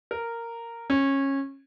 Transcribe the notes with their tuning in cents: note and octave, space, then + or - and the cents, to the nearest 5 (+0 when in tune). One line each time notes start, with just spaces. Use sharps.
A#4 -10
C#4 -20